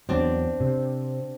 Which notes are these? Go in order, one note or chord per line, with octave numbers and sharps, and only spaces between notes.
E2 F#3 C4 D4
C3